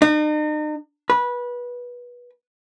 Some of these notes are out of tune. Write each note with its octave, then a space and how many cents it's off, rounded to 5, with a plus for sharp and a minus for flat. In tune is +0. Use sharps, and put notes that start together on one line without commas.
D#4 -40
B4 -20